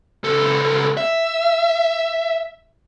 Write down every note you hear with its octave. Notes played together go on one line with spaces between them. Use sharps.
C#2 A4
E5